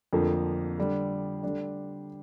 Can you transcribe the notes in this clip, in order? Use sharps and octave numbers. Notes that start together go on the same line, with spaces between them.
F2 D3 F3 A#3
D3 G3 D4
D3 G3 D4